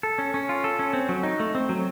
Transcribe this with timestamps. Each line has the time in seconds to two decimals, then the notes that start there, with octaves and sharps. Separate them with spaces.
0.03 A4
0.18 C#4
0.34 C#4
0.49 F4
0.64 A4
0.79 C#4
0.93 C4
1.09 F#3
1.23 D#4
1.40 A3
1.55 C4
1.69 F#3